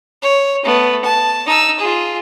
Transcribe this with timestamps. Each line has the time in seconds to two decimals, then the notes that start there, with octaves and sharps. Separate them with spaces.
0.22 C#5
0.63 A3 B3
1.04 A5
1.46 D#4 E6
1.79 F4 G#4